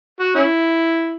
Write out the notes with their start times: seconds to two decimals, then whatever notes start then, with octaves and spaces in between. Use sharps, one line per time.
0.20 F#4
0.35 C#4 E4